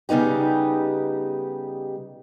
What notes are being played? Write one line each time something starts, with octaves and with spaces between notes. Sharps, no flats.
C#3 G3 B3 D#4 G4